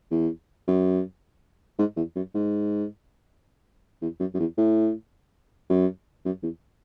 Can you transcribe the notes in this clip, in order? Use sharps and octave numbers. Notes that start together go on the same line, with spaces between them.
E2
F#2
G#2
E2
F#2
G#2
E2
F#2
F#2
E2
A2
F#2
F#2
E2